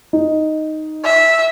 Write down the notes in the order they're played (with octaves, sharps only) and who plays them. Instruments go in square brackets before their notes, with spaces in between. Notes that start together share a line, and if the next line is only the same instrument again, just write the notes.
[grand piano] D#4
[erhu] E5